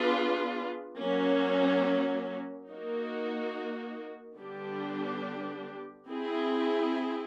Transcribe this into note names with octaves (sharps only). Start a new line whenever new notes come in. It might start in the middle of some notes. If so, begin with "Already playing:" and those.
Already playing: B3 D4 F4 G#4 B4
F#3 A#3 C#4
A#3 D#4 F#4 A#4
D3 G3 B3 D4 G4
C4 E4 G#4